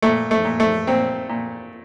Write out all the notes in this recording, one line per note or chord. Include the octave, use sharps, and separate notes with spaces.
A#2 A3
A3
A#2
A3
A#2 C4
A#2